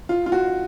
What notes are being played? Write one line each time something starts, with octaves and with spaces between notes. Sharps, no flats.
F4
F4
F#4